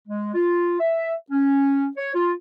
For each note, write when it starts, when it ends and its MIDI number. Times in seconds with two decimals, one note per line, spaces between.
0.08 0.31 56
0.34 0.76 65
0.80 1.13 76
1.31 1.87 61
1.97 2.13 73
2.15 2.33 65